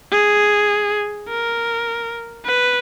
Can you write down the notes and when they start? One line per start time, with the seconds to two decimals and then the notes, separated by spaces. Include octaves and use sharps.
0.12 G#4
1.29 A#4
2.45 B4